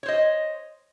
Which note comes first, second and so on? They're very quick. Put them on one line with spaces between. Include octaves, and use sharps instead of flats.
C#5 C5 D#5